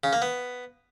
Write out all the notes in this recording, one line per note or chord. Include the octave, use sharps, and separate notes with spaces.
C#3
A#3
B3